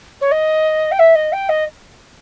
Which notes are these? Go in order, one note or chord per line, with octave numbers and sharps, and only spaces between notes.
C#5
D#5
G5
E5
D#5
G5
D#5